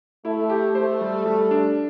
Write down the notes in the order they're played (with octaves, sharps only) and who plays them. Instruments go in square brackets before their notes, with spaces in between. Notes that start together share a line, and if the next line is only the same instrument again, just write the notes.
[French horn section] A3 [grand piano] E4
[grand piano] G4
[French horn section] A3 [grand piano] C5
[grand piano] G3
G3
D4